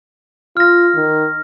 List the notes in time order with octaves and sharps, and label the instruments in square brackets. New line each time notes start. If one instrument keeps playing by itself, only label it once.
[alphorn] F4 [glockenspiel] F6 A#6
[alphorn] D#3